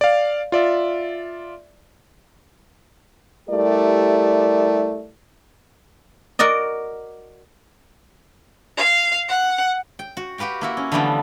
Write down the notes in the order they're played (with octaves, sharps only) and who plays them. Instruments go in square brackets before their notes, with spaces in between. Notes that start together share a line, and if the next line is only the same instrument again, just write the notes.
[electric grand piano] D5 F5
F4 D5 E5
[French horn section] G3 A3 E4 G4 A#4 D5
[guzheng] F#4 A#4 D5 D#5
[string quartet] F5
F#5
[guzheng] G5
F#4
F#4 G4 B4 F5 G5
A#3 E4 F#4
C#4
D3 E3 F3 G3 A3 B3